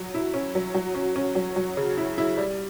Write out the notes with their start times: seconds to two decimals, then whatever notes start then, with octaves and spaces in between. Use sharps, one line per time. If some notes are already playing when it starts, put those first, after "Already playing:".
Already playing: F#3
0.14 E4
0.34 C#4
0.55 F#3
0.74 F#3
0.95 C#4
1.16 C#4
1.35 F#3
1.56 F#3
1.77 C#3
1.98 E4
2.18 E4
2.37 G3